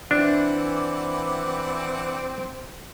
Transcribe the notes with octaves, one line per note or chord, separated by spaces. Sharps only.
E3 C4 D4 D5 F#5 D6